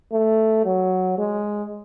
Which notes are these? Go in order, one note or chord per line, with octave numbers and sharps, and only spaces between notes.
A3
F#3
G#3